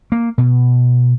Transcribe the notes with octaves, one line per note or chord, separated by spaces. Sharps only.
A#3
B2